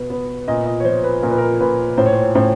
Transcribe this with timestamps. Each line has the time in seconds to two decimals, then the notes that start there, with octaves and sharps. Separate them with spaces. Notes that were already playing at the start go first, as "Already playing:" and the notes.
Already playing: B2 B3
0.10 B3
0.48 A#2 D#5
0.66 D#5
0.80 C#5
0.85 F3 C5
1.04 B4
1.22 A#2 A#4
1.31 B4
1.38 A#4
1.60 A#2 B4
1.98 A2 C5
2.06 C#5
2.13 C5
2.35 A2 C5